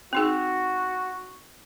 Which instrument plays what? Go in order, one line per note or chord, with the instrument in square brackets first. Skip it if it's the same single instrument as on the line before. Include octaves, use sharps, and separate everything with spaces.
[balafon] C4 D#4 G#4 [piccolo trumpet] F#4